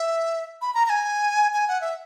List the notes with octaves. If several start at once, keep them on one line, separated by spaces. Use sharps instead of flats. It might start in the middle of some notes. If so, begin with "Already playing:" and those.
Already playing: E5
B5
A#5
A#5
G#5
G#5
F#5
E5